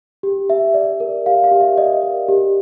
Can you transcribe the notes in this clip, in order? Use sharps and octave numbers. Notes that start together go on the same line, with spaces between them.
G4
G4 E5
D5
A#4
G4 F5
F5
G4
E5
D5 D#5
A#4
G4